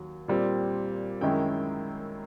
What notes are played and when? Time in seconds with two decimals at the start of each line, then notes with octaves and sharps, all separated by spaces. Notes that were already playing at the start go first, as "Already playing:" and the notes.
Already playing: D#2 F#3
0.28 A#2 G3 C4
1.21 F#2 D#3 G#3 C#4 E4 G5